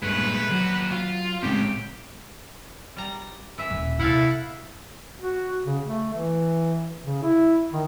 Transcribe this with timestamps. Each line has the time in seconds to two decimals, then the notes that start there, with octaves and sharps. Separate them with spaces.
0.03 G2 A#2 G#3 A3 B4
0.49 D#2 F#3 F#4
0.91 F4
1.43 A2 C#3 G#3 B3 C4 G4
2.96 G3 A#5
3.58 E3 E5
3.70 D#1
3.99 C3 E4 A4 F5 F#5
5.20 F#4
5.66 C#3
5.85 A3
6.13 E3
7.04 C#3
7.23 E4
7.72 D#3